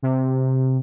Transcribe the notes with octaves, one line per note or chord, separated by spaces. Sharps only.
C3